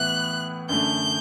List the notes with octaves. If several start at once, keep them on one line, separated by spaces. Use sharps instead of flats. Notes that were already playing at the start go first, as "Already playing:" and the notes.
Already playing: A2 E3 B3 E4 F#6
F#2 D3 A3 G6